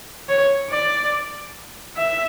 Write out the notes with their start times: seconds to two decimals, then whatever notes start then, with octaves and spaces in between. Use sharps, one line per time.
0.29 C#5
0.70 D5
1.97 E5